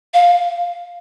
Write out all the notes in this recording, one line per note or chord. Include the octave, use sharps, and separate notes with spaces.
F5